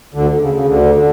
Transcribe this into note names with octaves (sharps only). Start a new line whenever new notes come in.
D2 D3
C#3
C#3
D2 D3
D3